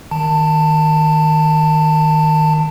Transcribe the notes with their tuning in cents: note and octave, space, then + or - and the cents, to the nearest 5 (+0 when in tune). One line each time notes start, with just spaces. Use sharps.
D#3 +0 A5 +20